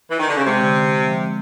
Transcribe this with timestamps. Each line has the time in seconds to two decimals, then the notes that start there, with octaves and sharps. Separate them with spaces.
0.10 E3
0.19 D#3
0.28 D3
0.37 C#3
0.46 C3 G#3
0.61 D3
0.76 D3
0.90 C4
1.06 F3
1.21 G#3